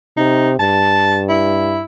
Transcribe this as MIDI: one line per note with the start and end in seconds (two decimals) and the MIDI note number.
0.17 0.57 48
0.17 0.50 63
0.59 1.85 43
0.59 1.20 81
1.29 1.83 64